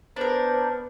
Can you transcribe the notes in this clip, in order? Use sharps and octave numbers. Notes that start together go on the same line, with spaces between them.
B3 D4 A#4 C5